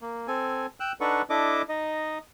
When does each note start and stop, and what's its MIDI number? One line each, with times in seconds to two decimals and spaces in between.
0.01 0.27 58
0.28 0.66 60
0.28 0.66 69
0.28 0.66 80
0.80 0.92 79
0.80 0.92 88
0.80 0.92 90
1.01 1.22 62
1.01 1.22 63
1.01 1.22 69
1.01 1.22 71
1.01 1.22 78
1.01 1.22 85
1.30 1.62 62
1.30 1.62 64
1.30 1.62 69
1.30 1.62 75
1.30 1.62 86
1.69 2.18 63
1.69 2.18 75